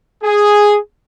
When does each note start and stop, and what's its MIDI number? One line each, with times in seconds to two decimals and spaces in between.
0.23 0.77 68